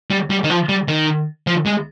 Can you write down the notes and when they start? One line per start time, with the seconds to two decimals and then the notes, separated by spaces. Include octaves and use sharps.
0.11 G3
0.30 G3
0.44 D#3
0.50 F3
0.69 G3
0.88 D#3
1.47 F3
1.66 G#3